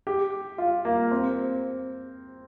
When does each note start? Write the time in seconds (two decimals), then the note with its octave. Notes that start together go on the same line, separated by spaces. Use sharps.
0.07 G4
0.58 F4
0.85 A#3
1.11 C4